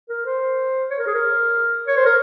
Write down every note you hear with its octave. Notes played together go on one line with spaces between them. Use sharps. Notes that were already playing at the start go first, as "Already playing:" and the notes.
A#4
C5
C#5
A#4
G#4
A#4
C#5
C5
A#4